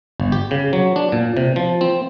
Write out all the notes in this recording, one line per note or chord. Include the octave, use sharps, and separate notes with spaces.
G1
G4
C#3
F#3
D4
A#2
C3
F3
C4